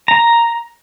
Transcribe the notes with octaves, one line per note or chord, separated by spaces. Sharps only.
A#5